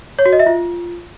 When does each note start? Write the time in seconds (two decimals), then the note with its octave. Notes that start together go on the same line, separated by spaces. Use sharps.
0.19 C#5
0.26 F#4
0.33 D#5
0.39 E5
0.46 F4